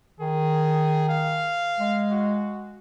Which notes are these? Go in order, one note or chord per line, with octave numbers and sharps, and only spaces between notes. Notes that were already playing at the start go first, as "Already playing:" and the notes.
D#3 G#4
F5
G#3
F#4